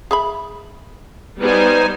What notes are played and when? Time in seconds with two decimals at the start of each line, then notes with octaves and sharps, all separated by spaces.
0.11 G#4 E5 B5
1.41 G3 B3 D#4 B4 C5 G#5